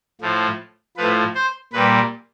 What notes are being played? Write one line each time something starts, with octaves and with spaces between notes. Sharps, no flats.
A2 F3
A2 F3 B4
C5
A#2 G3 B4